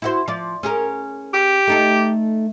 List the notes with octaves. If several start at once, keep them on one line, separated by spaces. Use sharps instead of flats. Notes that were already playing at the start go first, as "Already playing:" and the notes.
E4 F#4 C5
F3 D5
C#4 G#4 A#4
G4
A3 D#4 A4